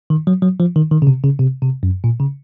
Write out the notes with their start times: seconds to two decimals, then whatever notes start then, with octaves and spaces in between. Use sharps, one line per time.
0.10 D#3
0.27 F#3
0.42 F#3
0.60 F3
0.76 D#3
0.91 D#3
1.02 C#3
1.07 C3
1.24 C#3
1.39 C3
1.62 C3
1.83 F#2
2.04 A#2
2.20 C#3